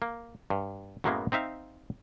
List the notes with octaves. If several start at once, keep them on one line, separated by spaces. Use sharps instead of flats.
A#3
G2
F#2 A2 F#3 G#3 A#3 B3
C4 D#4 E5 F5